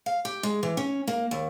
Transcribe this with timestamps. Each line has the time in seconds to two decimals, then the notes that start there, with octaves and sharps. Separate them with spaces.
0.06 F5
0.25 G4
0.43 G#3
0.63 E3
0.77 C#4
1.07 A#3
1.31 D#2